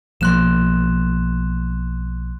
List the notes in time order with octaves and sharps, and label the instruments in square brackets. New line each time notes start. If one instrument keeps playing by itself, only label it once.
[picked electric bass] B1 F3 A#3 [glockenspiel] C6 F#6 E7